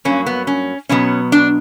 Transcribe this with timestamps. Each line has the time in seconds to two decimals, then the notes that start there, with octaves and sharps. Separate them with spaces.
0.05 G2 F#3 A#3 C#4
0.26 B3
0.47 C#4
0.89 B2 F#3 B3 C#4
1.32 D4